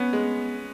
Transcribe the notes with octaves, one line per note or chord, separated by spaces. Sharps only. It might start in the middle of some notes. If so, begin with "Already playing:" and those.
Already playing: B3 C#4
G#3